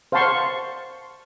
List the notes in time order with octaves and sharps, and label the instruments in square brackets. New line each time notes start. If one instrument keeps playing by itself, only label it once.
[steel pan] C5 F5 F#5 A5 C6 C#6